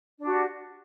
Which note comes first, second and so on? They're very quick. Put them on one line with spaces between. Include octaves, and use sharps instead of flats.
D4 F#4 G4